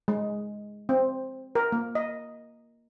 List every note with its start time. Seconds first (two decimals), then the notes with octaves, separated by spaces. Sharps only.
0.08 G#3
0.89 C4
1.55 A#4
1.72 A#3
1.95 D#5